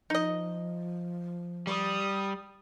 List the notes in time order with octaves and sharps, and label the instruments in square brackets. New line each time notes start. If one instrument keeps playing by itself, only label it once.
[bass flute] F3 [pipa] D#4 D#5
[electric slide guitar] G3 [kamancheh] D#6